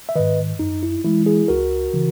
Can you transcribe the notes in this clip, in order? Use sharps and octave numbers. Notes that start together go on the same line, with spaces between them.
E5
G#2 D#3 B4 D#5
F#2 D#4
E4
E3 G#3 E4
E4 G#4
C#2 F#4 A#4
C#3 E3